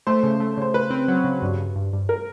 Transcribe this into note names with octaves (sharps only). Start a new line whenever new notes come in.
A3 C5
C#3
A3
C#3 C5
C#3 B4
C4
F#3
C#3
G2
G2
G2
G2
A#4